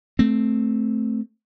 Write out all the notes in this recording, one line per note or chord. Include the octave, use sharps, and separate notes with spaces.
A3 C4